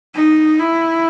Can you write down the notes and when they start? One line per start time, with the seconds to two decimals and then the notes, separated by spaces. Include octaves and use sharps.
0.14 D#4
0.59 E4